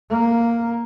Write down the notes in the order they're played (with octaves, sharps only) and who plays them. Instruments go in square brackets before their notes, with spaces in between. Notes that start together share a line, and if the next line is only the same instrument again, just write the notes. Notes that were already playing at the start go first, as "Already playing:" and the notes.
[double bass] A#3